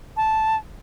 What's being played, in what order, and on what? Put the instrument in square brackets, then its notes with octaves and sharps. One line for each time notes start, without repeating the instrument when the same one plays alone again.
[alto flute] A5